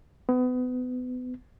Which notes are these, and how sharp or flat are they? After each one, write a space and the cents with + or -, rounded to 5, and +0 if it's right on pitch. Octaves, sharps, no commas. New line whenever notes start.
B3 +30